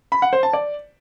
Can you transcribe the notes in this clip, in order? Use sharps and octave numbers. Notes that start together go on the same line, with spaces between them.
B5
F#5
C5
A5
D5